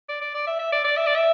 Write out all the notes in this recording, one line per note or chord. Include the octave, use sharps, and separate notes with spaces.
D5
D5
D5
E5
E5
D5
D5
E5
D5
E5